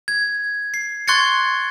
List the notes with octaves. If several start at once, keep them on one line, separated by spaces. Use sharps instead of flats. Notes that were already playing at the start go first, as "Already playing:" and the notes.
G#6
C7
C6 C#6 F#6 G#6 A6 C#7